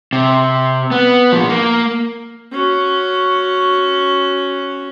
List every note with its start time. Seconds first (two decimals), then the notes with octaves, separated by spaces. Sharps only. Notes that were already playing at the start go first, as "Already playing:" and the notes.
0.13 C3
0.91 B3
1.32 A#2 F3
1.49 A#3
2.51 C#4 F#4